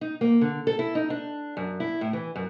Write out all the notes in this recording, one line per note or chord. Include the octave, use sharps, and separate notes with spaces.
D#4
A#3
D3
A4
E4
D#4
D4
F#2
E4
A2
E3
F#2